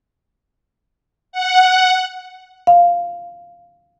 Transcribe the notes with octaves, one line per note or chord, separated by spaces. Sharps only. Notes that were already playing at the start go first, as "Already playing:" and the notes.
F#5
F5